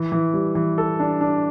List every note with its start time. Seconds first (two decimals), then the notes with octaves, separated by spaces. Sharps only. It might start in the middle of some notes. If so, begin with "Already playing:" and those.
Already playing: E3
0.12 E3
0.34 G3
0.55 E3
0.78 A4
1.00 D4
1.21 D4